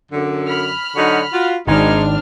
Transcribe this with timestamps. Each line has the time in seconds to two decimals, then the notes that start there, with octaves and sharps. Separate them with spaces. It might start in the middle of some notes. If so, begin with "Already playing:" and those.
0.12 F#2 D3
0.48 B5 F6
0.96 D3 F#3 D#4 F#4
1.33 F4 F#4
1.67 G#1 D#3 G#3 C4 D4 D#4 F6